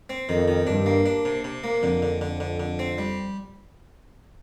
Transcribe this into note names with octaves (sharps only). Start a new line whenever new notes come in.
C4
F2 D#3
D#3
G2 D4
A#3
D4
C3
C3
A#3
F2 D3
D3
D3
D3
D3
C4
G3